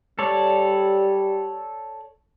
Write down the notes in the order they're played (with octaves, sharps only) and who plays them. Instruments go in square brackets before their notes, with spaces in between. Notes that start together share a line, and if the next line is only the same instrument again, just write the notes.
[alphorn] G3 [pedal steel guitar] A4 C#5 D5